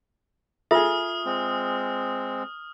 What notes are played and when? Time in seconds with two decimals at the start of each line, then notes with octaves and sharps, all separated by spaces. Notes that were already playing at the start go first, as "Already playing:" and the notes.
0.71 F4 G#4 A4 E5 D#6 F6
1.26 G#3 C4